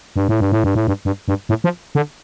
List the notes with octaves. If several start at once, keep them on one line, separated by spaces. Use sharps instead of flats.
G2
A2
G2
A2
G2
A2
G2
G2
G2
A2
F3
D3